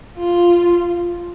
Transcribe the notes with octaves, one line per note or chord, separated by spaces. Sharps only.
F4